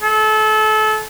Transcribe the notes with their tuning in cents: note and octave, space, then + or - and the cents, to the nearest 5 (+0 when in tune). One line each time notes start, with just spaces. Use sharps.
A4 -30